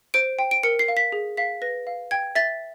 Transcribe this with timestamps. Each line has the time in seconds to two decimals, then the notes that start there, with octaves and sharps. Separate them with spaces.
0.14 C5 D7
0.39 G5
0.51 D7
0.63 A#4 C#7
0.79 C7
0.88 F5
0.97 B6
1.12 G#4
1.37 F5 B6
1.62 B4 A#6
1.87 F5
2.11 G5 G#6
2.35 E5 A6